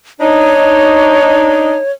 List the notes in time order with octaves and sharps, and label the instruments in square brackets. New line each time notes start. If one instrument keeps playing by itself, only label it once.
[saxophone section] D4 D#4 [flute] C#5